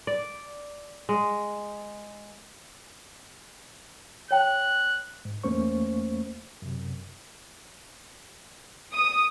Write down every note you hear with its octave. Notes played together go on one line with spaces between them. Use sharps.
D5
G#3
C#5 G5 A5 F#6
G#2
E2 A3 A#3 C#4 C5 C#6
F#2 C3
D#6